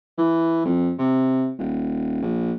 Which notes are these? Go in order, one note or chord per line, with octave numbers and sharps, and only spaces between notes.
E3
F2
C3
D#1
A#1